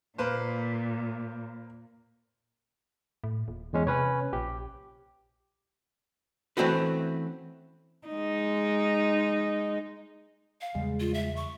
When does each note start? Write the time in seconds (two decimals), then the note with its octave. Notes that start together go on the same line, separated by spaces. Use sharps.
0.18 A#2 A#3 B4 C5
3.24 A2
3.48 D#1
3.73 E2 G#3 C#4
3.87 C3 C#4 B4 C#5
4.33 A#1 G4
6.57 E3 A3 C4 C#4 F#4 B4
8.08 G#3 D#4
10.61 F5
10.75 E2 C#3 G3 G#3
11.00 F4
11.14 E5
11.36 C#6